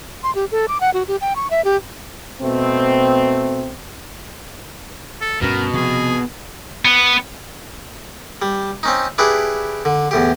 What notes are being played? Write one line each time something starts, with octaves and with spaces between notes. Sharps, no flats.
C6
G4
A4
D6
F#5
F#4
G4
G5
C#6
E5
G4
B2 A3 C4
A4
D2 G2 B2 C#4 A#4
C3 F3 G#4
B3
G3
C4 C#4 D#4
D4 E4 G4 G#4 B4
D3
E2 A2 G4